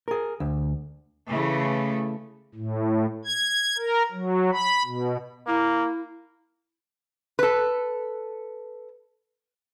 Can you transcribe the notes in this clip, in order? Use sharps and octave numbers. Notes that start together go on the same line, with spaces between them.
G#4 A#4
D2
C#3 E3 A3
A2
G#6
A#4
F#3
B5
B2
A#3 E4
A4 B4